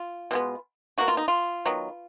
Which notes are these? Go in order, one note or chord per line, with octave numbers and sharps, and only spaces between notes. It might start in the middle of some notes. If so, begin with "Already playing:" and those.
Already playing: F4
B2 G#3 B3
B2 A#3 F#4
F4
D#4
F4
D#3 F#3 B3